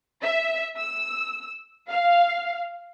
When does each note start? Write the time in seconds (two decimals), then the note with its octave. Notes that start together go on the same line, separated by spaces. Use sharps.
0.23 E5
0.77 E6
1.90 F5